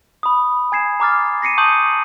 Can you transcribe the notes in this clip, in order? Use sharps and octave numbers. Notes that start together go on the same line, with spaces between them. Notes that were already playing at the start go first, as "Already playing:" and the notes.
B5 D#6
G#5 G#6 C7 E7
A#5 D6 F6 A6
A#6 C7 C#7 D#7
A5 C#6 D#6 G6 F#7